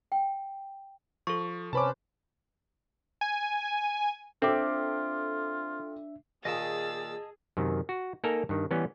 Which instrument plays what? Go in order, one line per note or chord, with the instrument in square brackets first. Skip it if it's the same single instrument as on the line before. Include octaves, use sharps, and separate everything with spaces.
[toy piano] G5
[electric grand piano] F3 [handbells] A4 C#6
[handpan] C3 B4 C5 [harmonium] C#4 [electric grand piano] A5 B5 D6
[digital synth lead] G#5
[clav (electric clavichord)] C4 [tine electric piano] D4 E5 [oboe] F4 [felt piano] A4 G5 D6
[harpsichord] D#2 A#2 [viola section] G#4 [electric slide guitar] D#5 A5 [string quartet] E6 A6
[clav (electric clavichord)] F#2 C3 D#3
F#4
A#3 D#4 A4 A#4 G#5 A#5
G2 D#3
E3 G3 B3 C#4